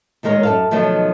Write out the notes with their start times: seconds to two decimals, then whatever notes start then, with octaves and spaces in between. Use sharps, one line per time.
0.23 A#2 D#3 G#3 A#4 C#5
0.43 F#2 A4 F5
0.71 B2 D#3 F3 F#3 A3